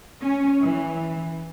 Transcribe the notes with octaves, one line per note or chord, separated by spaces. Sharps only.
C#4
E3